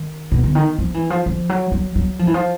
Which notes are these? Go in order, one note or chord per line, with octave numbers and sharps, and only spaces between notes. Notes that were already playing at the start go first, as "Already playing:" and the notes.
Already playing: D#3
B2
D3
D#3
F3
E3
F3
F3
F#3
F#3
F#3
F3
E3
F3